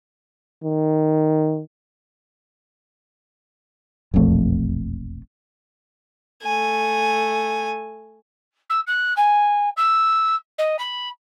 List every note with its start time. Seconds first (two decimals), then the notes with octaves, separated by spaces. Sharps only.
0.64 D#3
4.14 E1 A#1 F2 A3
6.43 A3 G#5
8.69 E6
8.87 F#6
9.16 G#5
9.76 E6
10.58 D#5
10.78 B5